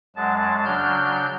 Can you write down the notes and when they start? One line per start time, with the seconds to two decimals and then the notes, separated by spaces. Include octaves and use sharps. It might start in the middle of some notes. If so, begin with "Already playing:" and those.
0.16 F#2 F#3 G#3 A5
0.65 C#3 F#3 D4 F6 G6